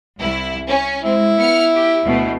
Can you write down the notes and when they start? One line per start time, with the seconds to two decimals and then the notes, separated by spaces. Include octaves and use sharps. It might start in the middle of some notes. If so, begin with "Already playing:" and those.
0.19 C2 E4
0.67 C#4
1.03 G#3 C4 E4
1.38 B3 F6 C#7
1.74 G4
2.05 D2 B2 A3